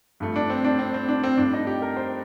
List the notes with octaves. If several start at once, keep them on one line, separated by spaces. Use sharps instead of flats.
G2 F3 A3
D4
C4
D4
C4
C4
D4
C4
G2 F3 A3 D4
D#4
G4
A#4
C5